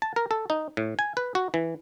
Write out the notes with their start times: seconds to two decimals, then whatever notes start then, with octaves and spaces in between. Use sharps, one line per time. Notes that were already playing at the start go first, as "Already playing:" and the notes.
0.02 A5
0.16 A#4
0.31 A4
0.50 D#4
0.77 A2
0.99 G#5
1.17 B4
1.35 F#4
1.54 E3